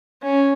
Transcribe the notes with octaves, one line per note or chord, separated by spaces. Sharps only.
C#4